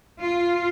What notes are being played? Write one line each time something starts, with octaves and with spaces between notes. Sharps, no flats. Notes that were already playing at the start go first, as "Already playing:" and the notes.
F4